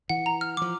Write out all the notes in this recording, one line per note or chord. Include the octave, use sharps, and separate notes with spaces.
E3 F#5
A#5
F6
F3 D6